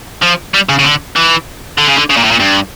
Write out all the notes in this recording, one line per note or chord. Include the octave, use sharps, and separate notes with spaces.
F3
G3
C#3
C#3
D3
E3
D3
C#3
D3
C#3
A#2
A2
A#2
G2